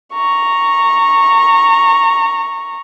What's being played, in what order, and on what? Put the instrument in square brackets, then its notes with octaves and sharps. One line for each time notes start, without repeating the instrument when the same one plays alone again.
[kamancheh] A#5 C#6